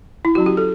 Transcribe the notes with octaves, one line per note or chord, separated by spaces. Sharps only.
E4
F#3 C#4 F#4
G4
A4